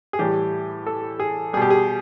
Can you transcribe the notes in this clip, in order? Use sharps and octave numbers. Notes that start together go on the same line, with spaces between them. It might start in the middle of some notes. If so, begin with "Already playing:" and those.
G#4
A2 E3 G3 G4
A4
G#4
B2 G3 G4 G#4
G#4